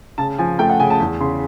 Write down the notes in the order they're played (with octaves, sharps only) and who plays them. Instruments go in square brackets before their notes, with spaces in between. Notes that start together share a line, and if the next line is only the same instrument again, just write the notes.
[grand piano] C#3 [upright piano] A5
[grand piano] F3 [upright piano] G#5
[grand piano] A3 [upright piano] G5
[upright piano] F#5
[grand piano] C#3 [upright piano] G#5
[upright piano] A5
[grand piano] E2
[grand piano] C#3 [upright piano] C6